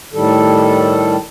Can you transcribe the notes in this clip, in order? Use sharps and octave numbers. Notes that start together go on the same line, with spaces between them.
A2 D#3 G3 A4